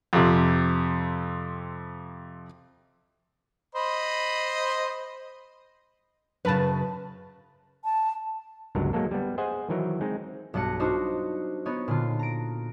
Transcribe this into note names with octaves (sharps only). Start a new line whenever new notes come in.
F2 C3
C5 D#5 B5
F#2 C#3 B4 A5
A5
G1 C#2 F#3 D4 A#4
F#3 G#3 A#3 A4
G3 B3
G#4 C5 D#5 F#5 G#5
D#3 E3 F#3 A#4
G#3 C4 D#4
B1 G2 F#5 A#6 C#7
D4 D#4 F4 F#4 C5
B3 D#4 C#5
A#2 D3 F4
A#5 D7